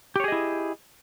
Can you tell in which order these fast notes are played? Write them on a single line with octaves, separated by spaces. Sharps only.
G4 C#5 G#4 D#5 E4